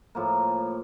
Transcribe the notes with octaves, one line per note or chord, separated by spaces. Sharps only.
A2 F3 A#3